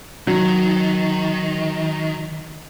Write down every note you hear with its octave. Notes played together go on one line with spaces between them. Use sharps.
D#3 F#3